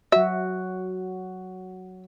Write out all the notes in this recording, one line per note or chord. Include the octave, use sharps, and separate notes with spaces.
F#3 F#4 E5